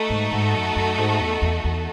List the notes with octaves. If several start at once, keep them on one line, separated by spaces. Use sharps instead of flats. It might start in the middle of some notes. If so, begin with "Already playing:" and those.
Already playing: A3 D#4 F#4 A4
G#2
G#2
F#2
F#2
G#2
E2
E2
E2